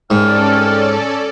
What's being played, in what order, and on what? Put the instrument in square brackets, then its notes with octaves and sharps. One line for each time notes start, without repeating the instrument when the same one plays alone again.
[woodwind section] C2 G5 F6 [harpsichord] G#2 [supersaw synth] C#4 A4 D5